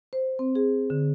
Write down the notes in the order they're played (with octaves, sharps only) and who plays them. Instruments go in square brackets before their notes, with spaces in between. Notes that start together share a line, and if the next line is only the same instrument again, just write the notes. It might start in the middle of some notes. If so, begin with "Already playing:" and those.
[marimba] C5
C4
G#4
D3